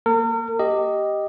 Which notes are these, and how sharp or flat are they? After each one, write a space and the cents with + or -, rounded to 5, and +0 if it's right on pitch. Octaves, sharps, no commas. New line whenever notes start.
A#3 +0 A#4 -40
G4 +0 D#5 +0